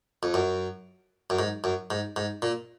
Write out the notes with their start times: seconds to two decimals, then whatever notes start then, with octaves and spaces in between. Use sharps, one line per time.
0.23 F2
0.34 F#2
1.30 F#2
1.39 G#2
1.64 F#2
1.91 G#2
2.16 G#2
2.42 A#2